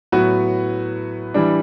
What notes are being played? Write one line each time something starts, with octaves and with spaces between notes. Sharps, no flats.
A2 F#3 B3 F#4 B4
E3 G3 D4